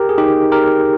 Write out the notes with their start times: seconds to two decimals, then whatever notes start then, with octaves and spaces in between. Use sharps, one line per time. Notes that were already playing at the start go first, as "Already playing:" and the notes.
Already playing: G4 A#4
0.09 G#4
0.18 D#4 G4
0.52 G4 A#4